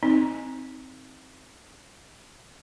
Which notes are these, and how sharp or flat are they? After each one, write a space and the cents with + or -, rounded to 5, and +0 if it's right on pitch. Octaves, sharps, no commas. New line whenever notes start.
C4 +0 D#4 +10